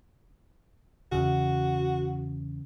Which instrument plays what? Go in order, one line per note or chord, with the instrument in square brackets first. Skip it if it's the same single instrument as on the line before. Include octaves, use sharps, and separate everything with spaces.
[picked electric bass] E2 C#3 [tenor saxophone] F#4